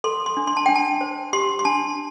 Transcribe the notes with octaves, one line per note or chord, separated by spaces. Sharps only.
A4 C6
C6
D4
C6
A5
D4 G5
A5
C5
G4 C6
C6
D4 A5